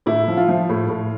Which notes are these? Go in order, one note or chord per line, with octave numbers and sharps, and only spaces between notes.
A2 E4
F3
F4
F3
A2
A2